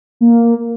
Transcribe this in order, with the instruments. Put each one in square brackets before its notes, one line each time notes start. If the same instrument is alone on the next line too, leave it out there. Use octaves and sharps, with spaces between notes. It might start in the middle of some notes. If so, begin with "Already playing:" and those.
[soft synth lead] A#3